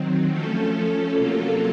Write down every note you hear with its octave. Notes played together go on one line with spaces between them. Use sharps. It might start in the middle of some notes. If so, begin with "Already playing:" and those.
Already playing: D#3 F#3 C4
F3 A3 C#4 A4
C3 F#3 A#3 F4 A4